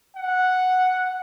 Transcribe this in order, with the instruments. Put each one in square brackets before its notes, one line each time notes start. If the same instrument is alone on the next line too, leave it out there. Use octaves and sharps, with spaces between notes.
[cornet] F#5